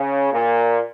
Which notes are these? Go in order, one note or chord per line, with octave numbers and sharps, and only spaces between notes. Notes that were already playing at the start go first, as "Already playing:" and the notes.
Already playing: C#3
A#2